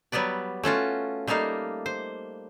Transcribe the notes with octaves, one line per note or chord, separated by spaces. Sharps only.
F#3 G3 B3 B4 D5
A3 C#4 F4 F#4
G3 A3 A#3 D#4 F5
C5